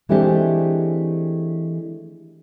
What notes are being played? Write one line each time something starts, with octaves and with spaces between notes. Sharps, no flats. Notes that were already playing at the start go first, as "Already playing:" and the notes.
E3 G#3 A3 C4 D4 G4